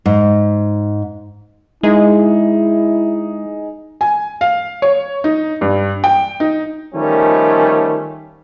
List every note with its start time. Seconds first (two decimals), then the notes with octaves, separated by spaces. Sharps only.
0.06 G#2
1.83 G#3 D#4 E4 G#4
4.01 G#5
4.41 F5
4.82 C#5
5.24 D#4
5.61 G2
6.04 G5
6.40 D#4
6.95 D#3 F3 G3 A3 C#4